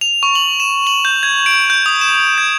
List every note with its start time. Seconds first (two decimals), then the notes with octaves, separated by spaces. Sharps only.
0.01 F7
0.23 C#6
0.35 F#7
0.60 E7
0.87 F#7
1.05 G6
1.23 G#6
1.46 D7
1.70 G6
1.86 D#6
2.01 E7
2.38 G#6